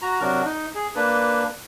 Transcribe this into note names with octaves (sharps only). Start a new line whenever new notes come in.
F#4 A#5
C3 F#3 D4 F#4 A#4
D#4
G#4
A#3 D4 B4